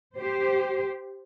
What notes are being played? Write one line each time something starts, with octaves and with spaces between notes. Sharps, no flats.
G4 C5